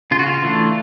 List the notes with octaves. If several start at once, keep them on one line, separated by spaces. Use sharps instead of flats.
C#3 F4
F#4
F4
E3 A3 D4